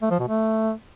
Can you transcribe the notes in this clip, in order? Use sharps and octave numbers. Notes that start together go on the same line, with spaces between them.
A3
F3
B2
A3